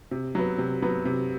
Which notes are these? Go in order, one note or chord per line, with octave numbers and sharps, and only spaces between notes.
C3
F#3 B3
C3
F#3 B3
C3